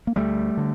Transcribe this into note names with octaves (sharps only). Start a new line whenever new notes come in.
A#3
D2 G3 A3
D3